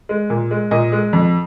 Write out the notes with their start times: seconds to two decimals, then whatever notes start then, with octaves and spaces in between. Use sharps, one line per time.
0.09 G#3
0.30 A#2
0.51 G#3
0.71 A#2 D#5
0.92 G#3
1.13 F2